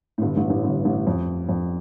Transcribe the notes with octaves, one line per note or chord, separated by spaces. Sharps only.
A2
G1 G2
A1 A2
A1 A2
G1 G2
A1 A2
F2
F2